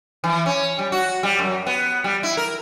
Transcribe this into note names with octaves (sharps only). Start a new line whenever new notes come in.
E3
C#4
G3
F#4
G3
F#2
B3
G3
E4
A#4